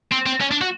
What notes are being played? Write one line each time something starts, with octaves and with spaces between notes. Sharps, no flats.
C4
C4
C#4
D4
F#4